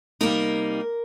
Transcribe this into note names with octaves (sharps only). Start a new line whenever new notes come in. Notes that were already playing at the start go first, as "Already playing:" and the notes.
C3 G3 A#3 D#4 A#4